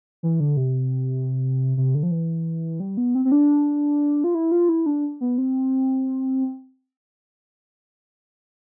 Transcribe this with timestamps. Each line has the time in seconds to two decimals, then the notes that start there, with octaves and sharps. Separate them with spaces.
0.23 E3
0.40 D3
0.57 C3
1.77 C3
1.95 D3
2.03 F3
2.11 E3
2.80 G3
2.97 B3
3.15 C4
3.25 C4
3.32 D4
4.24 F4
4.34 E4
4.52 F4
4.69 E4
4.86 D4
5.21 B3
5.38 C4